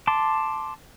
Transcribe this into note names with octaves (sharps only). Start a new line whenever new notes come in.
A5 C6 D6